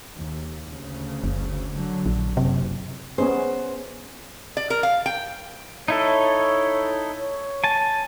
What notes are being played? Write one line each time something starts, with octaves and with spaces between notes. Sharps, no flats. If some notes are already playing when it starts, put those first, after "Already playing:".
D#2
D2 C#3
F#1
D3 F#3
A#1
F#1 C3
B3 C#4 G#4 C5
D5
A#4
F5
G5
D#4 E4 A4 C#5
C#5
G#5 A5